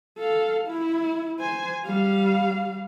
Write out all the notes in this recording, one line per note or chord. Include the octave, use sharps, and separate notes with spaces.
A4 F5
E4
C5 G#5
G3 F5